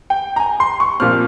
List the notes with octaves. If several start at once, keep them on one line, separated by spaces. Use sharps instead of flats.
G5
A#5
G#5
C6
C#6
A#2 F3 C4 F6